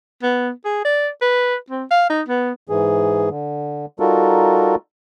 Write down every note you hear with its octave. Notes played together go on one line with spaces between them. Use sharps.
B3
G#4
D5
B4
C4
F5
D#4
B3
G#2 E3 G#4
D3
G3 D#4 F4 F#4 A4 A#4